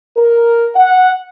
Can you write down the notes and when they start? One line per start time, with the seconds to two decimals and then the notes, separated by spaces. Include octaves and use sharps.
0.17 A#4
0.75 F#5